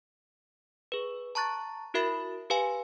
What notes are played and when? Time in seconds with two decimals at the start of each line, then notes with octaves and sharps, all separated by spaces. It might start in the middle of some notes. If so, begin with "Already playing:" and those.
0.92 G#4 B4
1.35 A5 A#5 C#6 F#6 A6
1.94 E4 F#4 A#4 E5 B5 A6
2.50 G4 B4 F5 G#5